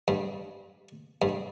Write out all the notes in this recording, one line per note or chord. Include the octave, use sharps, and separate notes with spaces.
G2
G2